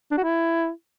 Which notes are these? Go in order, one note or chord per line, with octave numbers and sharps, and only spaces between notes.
D4
F#4
E4